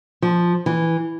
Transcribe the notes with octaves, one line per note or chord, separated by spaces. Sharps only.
F3
E3